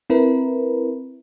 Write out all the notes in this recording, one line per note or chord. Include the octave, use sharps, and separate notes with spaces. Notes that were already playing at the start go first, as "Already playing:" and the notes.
C4 E4 A#4 B4